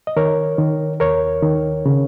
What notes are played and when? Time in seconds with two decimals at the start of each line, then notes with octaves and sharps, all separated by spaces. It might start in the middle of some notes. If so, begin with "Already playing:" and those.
0.07 D#5
0.17 D#3 A#4 C#5
0.58 D#3
1.00 D#2 A#4 C#5
1.43 D#3
1.86 C#3